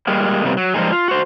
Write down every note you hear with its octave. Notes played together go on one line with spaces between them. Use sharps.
G3 G#3 A#3
C3 G3 A#3 B3
F#3
F3 G3 G#3 A#3 D#4 G#4
F4
F#4 C5